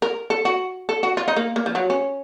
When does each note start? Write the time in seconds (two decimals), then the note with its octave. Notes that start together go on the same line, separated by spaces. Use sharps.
0.02 A#4
0.30 A4
0.45 F#4
0.89 A4
1.03 F#4
1.17 F4
1.28 D#4
1.36 A#3
1.56 A#3
1.66 F3
1.75 F#3
1.90 C#4